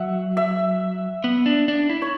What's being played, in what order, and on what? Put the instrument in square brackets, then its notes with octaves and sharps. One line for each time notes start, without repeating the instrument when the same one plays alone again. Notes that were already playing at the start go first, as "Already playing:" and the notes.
Already playing: [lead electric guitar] F#3 [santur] E5 F#5
[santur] E5
[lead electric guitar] B3
D4
D4
E4
[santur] C#5